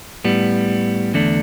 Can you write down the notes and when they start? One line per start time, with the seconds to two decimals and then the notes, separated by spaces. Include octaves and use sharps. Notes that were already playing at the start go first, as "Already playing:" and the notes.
0.24 A2 G3 B3
1.14 E2 D3 A3 D4